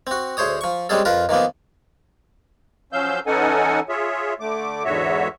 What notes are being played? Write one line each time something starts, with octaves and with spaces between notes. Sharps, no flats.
C4 F#4
D2 G#4 C5 C#5 D#6
F3 C#6
G3 G#3 C4 C#4 G#4 A4
F2 F4 A#4 B4
D#3 F3 A#3 B3
F3 F#3 C#4 F5 E6 G6
E3 C#4 D#4 A4 F#5 G#5
F4 G#4 C#5 E5
D3 A3 D6
E2 G#2 D3 F#4 C#5 E5